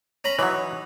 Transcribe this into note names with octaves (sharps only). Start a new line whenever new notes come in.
C#4 A#5 B5
E3 F#3 D#4 C#5